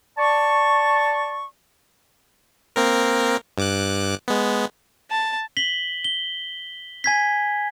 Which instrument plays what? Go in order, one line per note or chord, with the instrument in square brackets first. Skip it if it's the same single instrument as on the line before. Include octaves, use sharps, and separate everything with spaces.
[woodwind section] D5 A5 C#6
[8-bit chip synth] A#3 C4 A#4
G2 D6 F#6
G#3 B3
[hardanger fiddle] A5
[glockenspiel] B6 F#7 G7
G7
G#5 G#6 B6